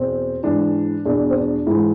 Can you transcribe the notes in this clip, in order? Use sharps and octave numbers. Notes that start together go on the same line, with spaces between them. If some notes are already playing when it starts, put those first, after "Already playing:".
Already playing: E2 B2 C4
G#2 E3 D4
E2 B2 D4
C4
D4
G#2 E3 E4